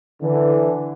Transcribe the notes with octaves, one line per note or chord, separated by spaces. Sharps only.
D3 E3